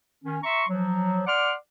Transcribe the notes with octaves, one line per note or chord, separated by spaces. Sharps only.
D#3 C#4
E5 A#5 C6 C#6
F3 F#3
D5 F#5 C6 D6 F6